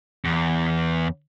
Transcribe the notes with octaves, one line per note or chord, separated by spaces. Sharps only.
E2